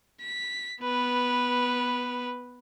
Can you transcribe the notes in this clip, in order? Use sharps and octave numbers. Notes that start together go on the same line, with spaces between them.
B6
B3 B4